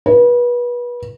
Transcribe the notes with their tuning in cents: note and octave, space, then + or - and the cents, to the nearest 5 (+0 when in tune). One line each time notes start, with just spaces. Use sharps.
B4 -30